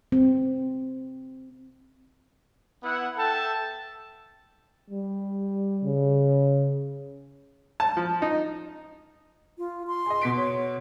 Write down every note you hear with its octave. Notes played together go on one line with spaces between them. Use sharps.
C4
B3 E4 F#5
A4 E5 G5 A5
G3
C#3
A5
F3
D#4
F4
C6
G#4 D#5
B2 B6 D7
C#5